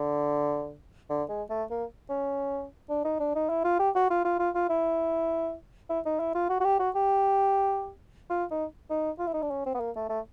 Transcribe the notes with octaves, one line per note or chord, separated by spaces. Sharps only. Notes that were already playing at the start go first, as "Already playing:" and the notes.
Already playing: D3
D3
G#3
A3
A#3
C#4
D4
D#4
D4
D#4
E4
F4
G4
F#4
F4
F4
F4
F4
E4
E4
D#4
E4
F4
F#4
F#4
G4
F#4
G4
F4
D#4
D#4
F4
E4
D#4
D4
C#4
C4
B3
A#3
A3
A3